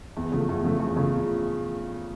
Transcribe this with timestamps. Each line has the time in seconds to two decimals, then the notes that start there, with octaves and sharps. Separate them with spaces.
0.17 E2
0.32 C#3 F3 A3
0.49 E2
0.64 C#3 F3 A3
0.80 E2
0.96 C#3 F3 A3